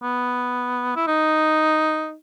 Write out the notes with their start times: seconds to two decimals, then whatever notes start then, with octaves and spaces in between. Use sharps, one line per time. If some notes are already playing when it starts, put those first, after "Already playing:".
0.03 B3
0.96 E4
1.07 D#4